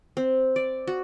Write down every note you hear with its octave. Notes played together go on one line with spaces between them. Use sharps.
C4
D5
F#4